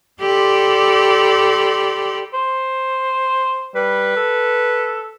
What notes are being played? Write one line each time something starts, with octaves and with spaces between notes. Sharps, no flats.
G4 A4 D5 B5 C6
C5
G3 B4
A4